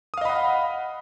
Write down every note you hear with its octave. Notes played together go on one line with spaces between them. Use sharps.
D#5 F5 F#5 B5 D#6